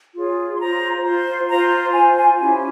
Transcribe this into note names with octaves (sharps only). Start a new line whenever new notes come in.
F4 G#4 C#5
C6
F4 C5 A#5
F4 C5
F4 C5 A#5
F4 C5 G#5
G#5
C#4 E4 G4 G#5